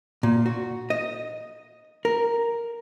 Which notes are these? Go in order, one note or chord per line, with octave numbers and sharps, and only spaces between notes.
A#2
F#4
D#5
A#4